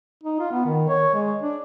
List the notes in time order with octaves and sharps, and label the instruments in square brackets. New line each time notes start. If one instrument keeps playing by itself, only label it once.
[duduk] D#4
F4
B3
D#3
C#5
G#3
D4